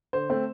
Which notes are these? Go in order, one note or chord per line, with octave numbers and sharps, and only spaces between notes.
D3 C5
A3 C4